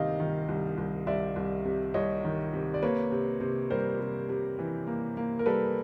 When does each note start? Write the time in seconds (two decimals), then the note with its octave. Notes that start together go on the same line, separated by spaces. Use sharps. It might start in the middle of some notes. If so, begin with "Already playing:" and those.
Already playing: C2 C3 D#3 D#5 F5
0.20 D#3
0.49 C2
0.78 C2
1.07 C2 D5 E5
1.36 C2
1.65 C3
1.94 C2 C#5 D#5
2.25 D#3
2.53 C3
2.74 D5
2.82 A#3 B4 C#5
3.12 C3
3.41 C3
3.70 G3 A#4 C5
4.00 C3
4.29 C3
4.59 E3
4.87 A#3
5.17 A#3
5.39 A#4
5.46 G3 A4 B4